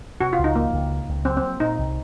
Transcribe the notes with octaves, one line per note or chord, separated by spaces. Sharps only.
C3 F#4
F4
C#2
D#4
F3 A#3
C#2
C#3
C#2
F#3 C4
C4
A#3
A#2 D#4
C2